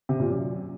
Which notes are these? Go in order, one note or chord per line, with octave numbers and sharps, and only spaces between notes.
C3
A#2
F#2